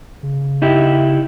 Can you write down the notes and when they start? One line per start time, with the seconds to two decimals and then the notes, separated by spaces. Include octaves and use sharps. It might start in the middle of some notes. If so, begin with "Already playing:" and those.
0.23 C#3
0.62 D#4 E4 G4